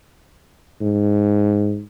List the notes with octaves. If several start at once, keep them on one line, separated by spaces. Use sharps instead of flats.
G#2